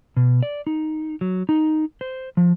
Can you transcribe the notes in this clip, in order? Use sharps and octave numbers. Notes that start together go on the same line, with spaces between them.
B2
D5
D#4
F#3
D#4
C5
F3